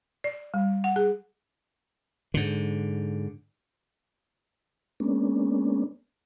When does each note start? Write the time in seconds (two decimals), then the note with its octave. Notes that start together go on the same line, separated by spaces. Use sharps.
0.24 D5
0.54 G3
0.84 F#5
0.96 G#4
2.34 G#2 D3
5.00 G#3 A#3 B3 C#4 D4